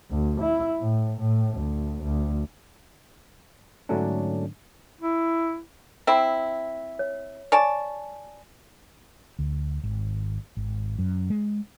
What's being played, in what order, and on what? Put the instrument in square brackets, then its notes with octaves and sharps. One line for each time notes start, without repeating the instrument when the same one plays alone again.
[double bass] D2
E4
A2
A2
D2
D2
[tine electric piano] G#2 D3 F#3 A3 C#4 D4
[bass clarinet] E4
[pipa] C4 E4
[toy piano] C#5
[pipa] C#5 D5 A5 [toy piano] G#5
[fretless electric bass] D2
G#1
G#1
F#2
G#3